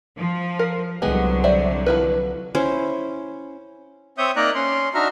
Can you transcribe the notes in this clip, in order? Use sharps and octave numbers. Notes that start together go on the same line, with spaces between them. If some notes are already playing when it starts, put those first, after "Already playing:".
F3
A#4
C2 D3 F#3 G#3 B3 G#4
C5 D5 E5
F3 E4 B4
C#4 E4 C5
C4 C#5 E5 D#6 G6
A#3 D#4 A#4 D5 A#5 F#6
C#4 C6
D4 D#4 F#4 E5 A#5 F6